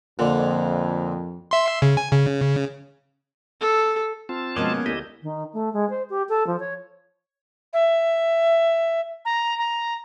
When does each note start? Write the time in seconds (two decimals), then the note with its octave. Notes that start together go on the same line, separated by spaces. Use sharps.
0.19 F2 A#2 D3
1.51 E5 C6
1.82 C#3
1.97 G#5
2.12 C#3
3.61 A4
4.29 C4 F4 A5
4.56 B2 F3 G#3 A#3 B3 C#4 A#4
4.86 D2 E4 G4 D#5
5.23 D#3
5.53 A3
5.73 G#3
5.90 C5
6.10 G4
6.29 A4
6.47 F3
6.60 C#5
7.73 E5
9.25 A#5
9.58 A#5